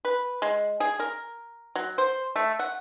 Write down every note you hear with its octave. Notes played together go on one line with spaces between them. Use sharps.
B4
G#3
G#4
A#4
F#3
C5
A3
F#5